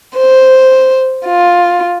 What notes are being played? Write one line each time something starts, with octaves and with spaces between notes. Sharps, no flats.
C5
F4